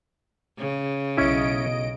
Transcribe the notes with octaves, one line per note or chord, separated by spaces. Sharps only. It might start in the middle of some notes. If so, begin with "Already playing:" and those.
C#3
B1 C#4 E4 D#5 D7